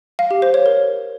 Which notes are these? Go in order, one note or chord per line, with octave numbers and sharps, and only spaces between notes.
F5
G4
C5
C#5
A#4